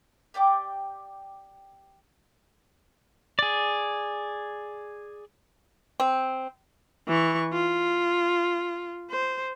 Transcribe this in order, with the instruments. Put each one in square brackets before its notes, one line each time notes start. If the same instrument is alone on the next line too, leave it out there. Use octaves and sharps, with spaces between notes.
[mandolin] G4 D5 G5 D6
[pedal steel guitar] G#4 D5
[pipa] C4
[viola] E3 C#6
F4
C5